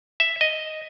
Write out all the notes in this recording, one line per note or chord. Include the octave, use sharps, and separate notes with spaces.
E5
D#5